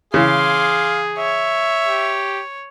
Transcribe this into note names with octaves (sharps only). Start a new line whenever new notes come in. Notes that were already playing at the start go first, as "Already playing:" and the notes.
C#3 E3 G#4 F5 C6 D6
C#5 E5
G4